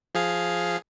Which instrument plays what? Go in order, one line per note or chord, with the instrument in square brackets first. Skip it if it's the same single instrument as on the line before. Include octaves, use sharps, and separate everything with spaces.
[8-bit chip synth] F3 G#4 F5